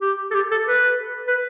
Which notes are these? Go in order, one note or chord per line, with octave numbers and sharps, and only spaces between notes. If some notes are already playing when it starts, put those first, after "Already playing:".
G4
A4
G4
A4
B4
B4